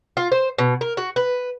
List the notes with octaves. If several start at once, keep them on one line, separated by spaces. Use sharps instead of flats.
F4
C5
B2
A#4
F#4
B4